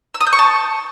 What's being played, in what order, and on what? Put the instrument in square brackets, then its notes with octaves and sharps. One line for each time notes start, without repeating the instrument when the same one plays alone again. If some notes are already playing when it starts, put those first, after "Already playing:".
[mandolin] E6
D#6
G6
C#6
A5